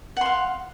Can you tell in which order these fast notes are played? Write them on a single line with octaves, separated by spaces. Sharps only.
F#5 C6 F5